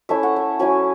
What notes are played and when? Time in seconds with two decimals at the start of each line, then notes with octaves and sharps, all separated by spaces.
0.09 A3 C#4 E4 E5
0.23 F#5
0.36 E5
0.59 F#3 C#4 E4 G#5